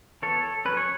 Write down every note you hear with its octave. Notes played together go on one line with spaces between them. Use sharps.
E3 B3 A4 C#5
F#3 C#4 B4
C#5